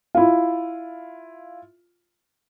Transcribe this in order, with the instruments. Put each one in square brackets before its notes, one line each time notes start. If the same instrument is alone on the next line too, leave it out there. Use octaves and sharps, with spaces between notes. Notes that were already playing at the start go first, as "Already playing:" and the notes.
[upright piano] E4 F4